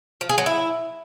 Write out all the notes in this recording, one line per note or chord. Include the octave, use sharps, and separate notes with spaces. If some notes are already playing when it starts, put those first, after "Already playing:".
F3
G#4
F#3
E4